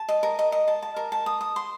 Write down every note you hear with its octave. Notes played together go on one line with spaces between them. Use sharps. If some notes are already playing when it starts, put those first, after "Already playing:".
Already playing: A5
D#5
A#4
D#5
D#5
A5
A5
A#4
A5
D#6
D#6
C6